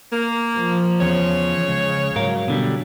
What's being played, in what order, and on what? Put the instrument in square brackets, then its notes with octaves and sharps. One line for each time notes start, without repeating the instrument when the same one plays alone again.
[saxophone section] A#3
[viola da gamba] F3
[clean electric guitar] E2 [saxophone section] C#3 C#5
[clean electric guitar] C#2
[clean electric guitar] G#2 A#4 F5 [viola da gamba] F#3
[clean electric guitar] B2 D3 G3